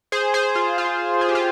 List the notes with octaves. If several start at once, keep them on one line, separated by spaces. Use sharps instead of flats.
G#4 C5
G#4 C5
F4
F4
G#4
G4
F4